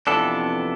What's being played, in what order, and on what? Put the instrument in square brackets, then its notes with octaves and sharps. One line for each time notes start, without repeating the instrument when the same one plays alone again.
[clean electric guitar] F2 C3 E3 B3 D4 A4